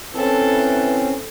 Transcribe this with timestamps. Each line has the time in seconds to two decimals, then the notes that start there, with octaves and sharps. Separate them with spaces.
0.14 C4 C#4 E4 A4 B4